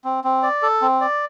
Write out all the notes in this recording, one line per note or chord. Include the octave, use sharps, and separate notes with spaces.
C4
C4
D5
A4
C4
D5